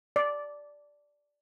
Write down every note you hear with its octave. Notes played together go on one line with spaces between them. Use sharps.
D5